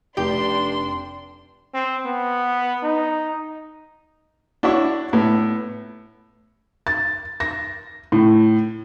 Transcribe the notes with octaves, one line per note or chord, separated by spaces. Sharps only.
F1 D4 G4 C6
C4
B3
D#4
D4 E4 F#4 C#5 E5 C#6
A2 B3
A6
A#6
A2